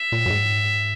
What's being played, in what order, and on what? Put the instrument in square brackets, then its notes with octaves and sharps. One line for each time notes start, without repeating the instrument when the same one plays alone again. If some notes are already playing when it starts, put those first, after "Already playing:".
Already playing: [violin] E5
[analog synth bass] A#2
F#2
G#2